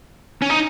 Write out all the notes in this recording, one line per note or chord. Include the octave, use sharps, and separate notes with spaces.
C#4
D#4